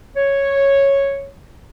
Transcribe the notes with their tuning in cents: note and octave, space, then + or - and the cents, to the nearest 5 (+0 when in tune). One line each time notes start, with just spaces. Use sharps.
C#5 -5